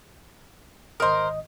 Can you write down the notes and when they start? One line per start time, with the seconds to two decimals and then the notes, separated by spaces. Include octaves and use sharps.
1.00 G#1 A#4 C5 D#5 D#6